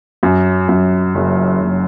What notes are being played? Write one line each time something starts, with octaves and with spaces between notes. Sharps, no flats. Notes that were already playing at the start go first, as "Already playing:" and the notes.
F#2
F#2
F#1
F#1